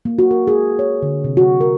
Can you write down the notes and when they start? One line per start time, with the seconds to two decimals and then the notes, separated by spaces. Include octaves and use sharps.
0.05 A#3
0.19 F#4
0.31 A#4
0.47 G#4
0.79 C#5
1.02 D3
1.24 C3
1.37 F#4
1.61 A#4